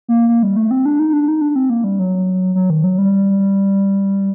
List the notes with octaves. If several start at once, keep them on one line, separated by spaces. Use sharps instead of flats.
A#3
A#3
G3
A3
C4
D4
D#4
D4
D#4
D4
C4
A#3
G3
F#3
F#3
D#3
F#3
G3